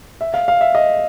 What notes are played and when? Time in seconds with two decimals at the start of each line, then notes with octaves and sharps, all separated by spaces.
0.21 E5
0.34 F5
0.48 F5
0.61 E5
0.75 D#5